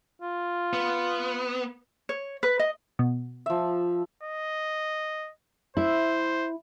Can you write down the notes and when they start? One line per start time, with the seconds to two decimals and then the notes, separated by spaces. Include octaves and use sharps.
0.22 F4
0.73 B3
2.09 C#5
2.43 B4
2.59 D#5
2.99 B2
3.46 F3 E5
4.23 D#5
5.77 E4 C5